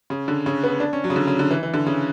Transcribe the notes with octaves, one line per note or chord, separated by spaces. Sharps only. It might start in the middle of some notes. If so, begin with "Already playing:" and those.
C#3
D3
C#3
B3
D4
C#4
F#3
C#3
D3
C#3
D3
E3
E3
D3
C#3